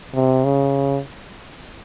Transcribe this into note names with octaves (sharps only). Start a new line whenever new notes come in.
C3
C#3